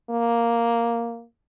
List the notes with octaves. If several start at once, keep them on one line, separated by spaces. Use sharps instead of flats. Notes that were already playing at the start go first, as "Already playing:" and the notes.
A#3